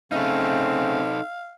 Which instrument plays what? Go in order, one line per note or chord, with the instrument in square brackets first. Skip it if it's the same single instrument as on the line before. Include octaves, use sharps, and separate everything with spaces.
[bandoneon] C#3 A3 C#4 [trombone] C4 [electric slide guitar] D#4 A4 [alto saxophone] F5